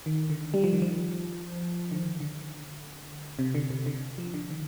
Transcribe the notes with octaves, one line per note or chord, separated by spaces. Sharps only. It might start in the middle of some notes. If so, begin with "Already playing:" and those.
D#3
D3
G3
F3
D#3
F3
D3
D#3
D3
C3
D3
C3
D3
F3
D3
D#3